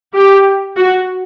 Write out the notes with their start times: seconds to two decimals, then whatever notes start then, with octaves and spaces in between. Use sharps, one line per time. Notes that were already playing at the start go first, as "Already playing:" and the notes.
0.14 G4
0.76 F#4